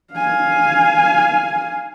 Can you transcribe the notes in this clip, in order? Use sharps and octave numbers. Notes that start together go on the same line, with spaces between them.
F5 G#5